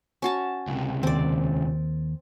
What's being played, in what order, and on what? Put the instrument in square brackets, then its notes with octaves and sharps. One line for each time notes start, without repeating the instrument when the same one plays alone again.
[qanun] C#4 F#4 A5
[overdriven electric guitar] C#2 C3
[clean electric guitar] D#2 [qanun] C4 D5